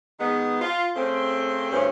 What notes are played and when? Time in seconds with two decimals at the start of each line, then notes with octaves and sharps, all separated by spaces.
0.19 D#3 G#3 B3
0.61 F4
0.95 C#3 A3 C4
1.72 D2 G2 E3 C#4 C5